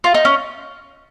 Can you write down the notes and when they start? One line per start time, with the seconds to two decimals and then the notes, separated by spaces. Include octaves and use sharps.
0.04 F4
0.14 D#4
0.25 C#4